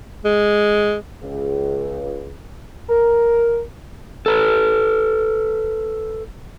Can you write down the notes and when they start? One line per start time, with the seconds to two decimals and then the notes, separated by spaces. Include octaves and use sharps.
0.25 G#3
1.23 C#2
2.89 A#4
4.26 A4 B4